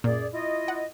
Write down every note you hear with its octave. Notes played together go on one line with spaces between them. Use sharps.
F#2 A#2 G#4 D5
E4 F4 D#5
F#5